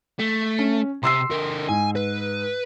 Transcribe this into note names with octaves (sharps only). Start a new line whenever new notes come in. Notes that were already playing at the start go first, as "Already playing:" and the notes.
A3
C#4
C3 G4 C6 E6 C7
D3 A#4
G#2 G#5
B4